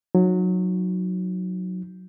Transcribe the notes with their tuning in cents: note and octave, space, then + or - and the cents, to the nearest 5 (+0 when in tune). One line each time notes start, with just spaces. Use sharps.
F#3 -15 D#4 +0